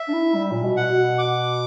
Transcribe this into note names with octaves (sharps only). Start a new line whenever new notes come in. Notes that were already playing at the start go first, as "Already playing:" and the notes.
Already playing: E5
D4
E4
G3
A#2
B2
F#5
B2
D6